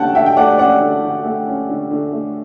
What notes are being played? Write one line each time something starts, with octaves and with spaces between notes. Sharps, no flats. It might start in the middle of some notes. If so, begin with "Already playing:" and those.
Already playing: D3 A3 C#4 F#5 G5 A5
D3 E5 G5
G5
A3 D5 F#5
C#4 D5 F#5
D3
D3
A3
C#4
D3
D3
A3